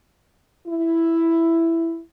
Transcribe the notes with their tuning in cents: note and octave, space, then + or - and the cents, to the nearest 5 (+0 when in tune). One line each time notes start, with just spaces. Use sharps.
E4 +5